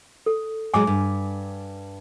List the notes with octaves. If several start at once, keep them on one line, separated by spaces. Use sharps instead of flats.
A4
A2 F#3 G#3 G#5 D6
G2